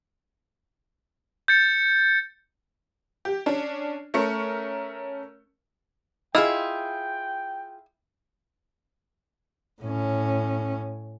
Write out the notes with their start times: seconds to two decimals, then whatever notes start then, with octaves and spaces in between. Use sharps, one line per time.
1.48 G6 A6 C#7
3.25 G4
3.46 C#4 D4
4.14 A3 C#4 A#4 C#6 C#7
6.35 E4 F4 G#4 D#5 G5 B5 F6
9.82 A2 C#4